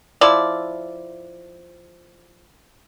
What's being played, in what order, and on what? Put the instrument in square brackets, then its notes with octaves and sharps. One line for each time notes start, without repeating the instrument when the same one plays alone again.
[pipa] F3 E4 D5